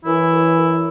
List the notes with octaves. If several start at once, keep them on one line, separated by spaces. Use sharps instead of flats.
F#2 E3 E4
F#2
F#2